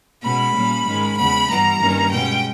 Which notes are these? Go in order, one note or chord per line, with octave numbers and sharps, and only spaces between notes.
B2 G#3 C#4 B5
A#2 G3 A#3 C#4
G#2 D#3 G#3 C#4
E2 C#3 G#3 B3 B5
G2 E3 G3 B3 A#5
G2 D#3 A#3 C#4
B2 G#3 C#4 G5